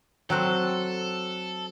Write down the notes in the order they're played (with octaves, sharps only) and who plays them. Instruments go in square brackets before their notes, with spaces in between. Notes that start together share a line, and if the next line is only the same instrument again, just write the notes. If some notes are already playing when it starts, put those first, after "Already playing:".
[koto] F#3 C4 [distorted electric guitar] A4 [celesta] G5 E6 F#6